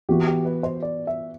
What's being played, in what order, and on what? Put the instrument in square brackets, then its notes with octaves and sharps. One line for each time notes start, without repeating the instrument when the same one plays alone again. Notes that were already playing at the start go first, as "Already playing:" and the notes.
[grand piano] E3 B3 F#4 [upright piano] G4
[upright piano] G4
B4
C5
D5
E5